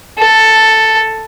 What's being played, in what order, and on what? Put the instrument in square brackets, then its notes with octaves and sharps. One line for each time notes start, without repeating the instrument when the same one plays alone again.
[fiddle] A4